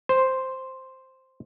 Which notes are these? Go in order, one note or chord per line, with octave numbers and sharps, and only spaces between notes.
C5